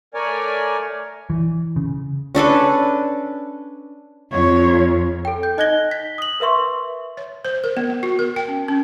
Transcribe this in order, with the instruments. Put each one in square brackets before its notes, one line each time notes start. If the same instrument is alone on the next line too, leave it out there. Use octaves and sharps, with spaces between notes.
[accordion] A3 A#4 C#5 D5 G#5
[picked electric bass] E3
C#3
[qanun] C#4 D4 A4 B4
[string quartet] F2 [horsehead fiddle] C#5
[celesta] A4 G5
G6
D#4 D#5 F#6 G#6 A#6 G7
B6
D#6 F#7
A#4 B4 E5 C6 C#6
[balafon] C#5
C5
A#4
B3
B3
F#4
A#4
G5
C#4
C#4